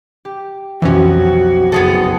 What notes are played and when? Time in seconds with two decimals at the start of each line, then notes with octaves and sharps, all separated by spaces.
0.25 G4
0.82 B1 F2 E3 C#4 F#4
1.72 F#1 A3 B3 G#4 A4 D#7